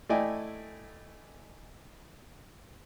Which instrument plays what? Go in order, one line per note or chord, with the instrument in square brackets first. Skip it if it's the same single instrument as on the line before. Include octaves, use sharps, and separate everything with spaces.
[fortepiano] A3 E4 D5 D#5 G5 G#5